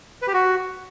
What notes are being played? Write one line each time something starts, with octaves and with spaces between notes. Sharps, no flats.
B4
G4
F#4